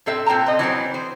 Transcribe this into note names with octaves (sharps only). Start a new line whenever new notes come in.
A2 C4 A4 E5
A#2 C4 G5 A5 A#5
C4 D#5
E3 F#3 B3 C4
C5